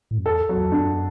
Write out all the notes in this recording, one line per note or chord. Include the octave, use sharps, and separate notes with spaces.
A2
F#2
E2 A4
F#3
E2
F#2 D4